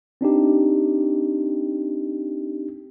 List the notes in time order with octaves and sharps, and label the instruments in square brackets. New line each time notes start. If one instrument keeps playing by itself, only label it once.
[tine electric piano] C4 D4 D#4 G4